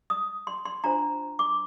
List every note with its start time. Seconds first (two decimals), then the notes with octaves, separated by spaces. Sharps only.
0.10 D#6
0.47 C6
0.65 C6
0.84 D4 F4 C5 A#5
1.39 D6